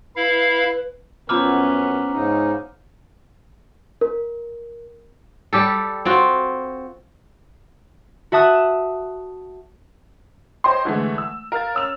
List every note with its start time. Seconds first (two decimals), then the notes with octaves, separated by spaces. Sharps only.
0.16 E4 B4 F5
1.29 F#2 F3 B3 C#4 E4 A#5 D6 F6
2.12 G#2 C#3 D#4
4.01 A#4
5.53 G3 G4 A4
6.05 C4 F4 F#4
8.32 F#4 E5 A5 D#6 F#6
10.64 C5 C#5 D#5 G5 C6
10.85 D3 E3 G#3 A3
11.18 E6
11.52 A#4 F5 F6 A6
11.74 C#4 E6 F7